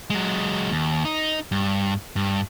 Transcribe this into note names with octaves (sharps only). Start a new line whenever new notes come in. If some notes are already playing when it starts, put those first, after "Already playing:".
F#3 G#3
D#2
D#4
G2
G2